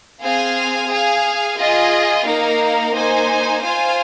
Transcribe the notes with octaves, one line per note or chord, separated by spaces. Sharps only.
C4 G#4 F5 G#5
G#4 F5 G#5
F4 G#4 D#5 G#5
A#3 D#4 A#4 F5
A#3 D#4 C5 G#5
F4 C5 F5 G#5